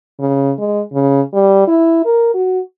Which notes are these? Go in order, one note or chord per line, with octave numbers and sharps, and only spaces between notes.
C#3
G#3
C#3
G3
E4
A#4
F#4